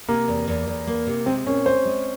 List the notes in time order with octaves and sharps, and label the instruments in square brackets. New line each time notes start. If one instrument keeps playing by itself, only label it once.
[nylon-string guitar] C3 [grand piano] A#3
[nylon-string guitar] E2
E2
E2
A#3
C3
[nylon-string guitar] G#3 [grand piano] C4
[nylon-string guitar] A#2 [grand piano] C#4
[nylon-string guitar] G#3 [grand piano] C5
[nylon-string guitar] G#3